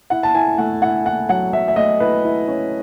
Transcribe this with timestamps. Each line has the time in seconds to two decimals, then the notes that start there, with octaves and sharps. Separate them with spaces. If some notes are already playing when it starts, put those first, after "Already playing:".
0.10 E4 F#5
0.23 A5
0.34 E4 G#5
0.58 A3 F#5
0.82 E4 F#5
1.05 E4 F#5
1.29 F#3 F#5
1.53 F#3 E5
1.68 E5
1.76 A3 D#5
2.00 E4 B4
2.24 E4
2.48 C#4